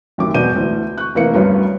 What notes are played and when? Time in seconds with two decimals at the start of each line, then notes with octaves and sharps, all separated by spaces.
0.18 A1 F#2 D#3 D6
0.34 E1 B2 B3 D5 G6 D#7
0.56 D2 E3
0.98 C#6 F#6
1.15 F1 E3 A#3 B4 F5 C#7
1.34 D2 G2 F#3 G3 B3 C#4